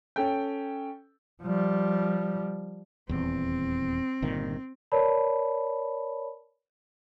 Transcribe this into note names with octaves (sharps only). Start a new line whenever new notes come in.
C#4 A4 G5
F3 G3
D#1 E2 C4
G1 A#2 D#3
A#4 B4 C#5 D5 A5 B5